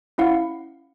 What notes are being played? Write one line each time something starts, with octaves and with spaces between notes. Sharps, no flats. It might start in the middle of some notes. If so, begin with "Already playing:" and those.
C#4 E4 F5 F#5